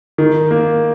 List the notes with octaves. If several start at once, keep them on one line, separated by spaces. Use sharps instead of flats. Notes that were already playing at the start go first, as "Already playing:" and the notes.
D#3
A#3